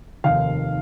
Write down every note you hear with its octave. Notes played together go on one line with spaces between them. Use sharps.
F1 D#2 D#3 F5